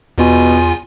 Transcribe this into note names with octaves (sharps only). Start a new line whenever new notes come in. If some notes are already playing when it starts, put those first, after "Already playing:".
E2 B2 F4 G#5